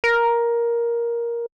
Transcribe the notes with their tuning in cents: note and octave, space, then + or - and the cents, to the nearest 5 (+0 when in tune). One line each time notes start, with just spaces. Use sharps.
A#4 +10